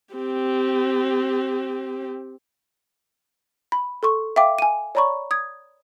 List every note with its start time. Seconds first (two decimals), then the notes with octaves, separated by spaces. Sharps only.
0.15 C4 G4
3.72 B5
4.03 A4 C6 C#6
4.36 E5 F5 G5 D6
4.59 G#5 D#7
4.95 C#5 D5 A#5 B5 C#6
5.31 D#6 G#6